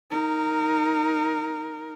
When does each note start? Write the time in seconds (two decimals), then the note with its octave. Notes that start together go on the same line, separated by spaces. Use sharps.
0.10 D#4 A#4